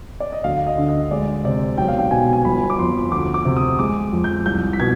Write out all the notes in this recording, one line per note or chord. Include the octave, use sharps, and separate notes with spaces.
D5
D#5
D2 F5
D#5
D3
D#5
G#3 D5
C3 D5
B1 G5
F5
G5
B2 G#5
G#5
G1 B5
D6
F2 C6
D2 D6
D6
C3
D#6
G#3 D6
F2
G6
C2 G6
B6
B2 G#6